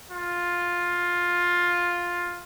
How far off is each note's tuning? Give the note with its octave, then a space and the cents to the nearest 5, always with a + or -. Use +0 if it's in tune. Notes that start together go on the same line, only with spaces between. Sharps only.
F4 +10